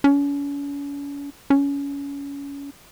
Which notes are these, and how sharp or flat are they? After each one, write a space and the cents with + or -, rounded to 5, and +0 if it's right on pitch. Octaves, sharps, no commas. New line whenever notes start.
C#4 +40
C#4 +25